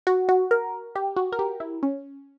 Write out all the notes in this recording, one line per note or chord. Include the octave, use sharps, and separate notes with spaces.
F#4
F#4
A#4
G4
F#4
A#4
G4
E4
C#4